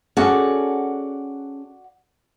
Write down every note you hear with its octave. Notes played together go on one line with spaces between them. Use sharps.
C#4 F#4 G#4 A4 D5 F#5